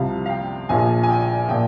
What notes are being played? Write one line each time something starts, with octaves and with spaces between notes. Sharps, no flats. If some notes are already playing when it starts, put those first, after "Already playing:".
Already playing: C2 C3 F3 F5
F5
G5
A#1 A#2 F3 G#5
G#5
G5
A#2 F3 G5